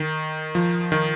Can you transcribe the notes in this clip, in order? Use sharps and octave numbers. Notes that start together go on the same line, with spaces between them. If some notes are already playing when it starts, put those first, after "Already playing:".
Already playing: D#3
F3
D#3